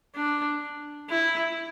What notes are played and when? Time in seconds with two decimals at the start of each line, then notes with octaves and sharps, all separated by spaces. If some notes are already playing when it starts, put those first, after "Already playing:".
0.15 D4
1.09 E4